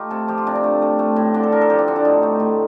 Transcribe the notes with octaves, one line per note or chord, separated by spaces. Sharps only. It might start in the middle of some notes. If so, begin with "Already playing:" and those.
Already playing: A3 D#4 F4 G4
C3 A4
F3 G4
F4
C3 D4
C4
A3
A3
A3
A2
D3 D4
A4
F3 A#4
A4
F3 G4
D4
D3 C4
D4
A2 D#4
A3
A2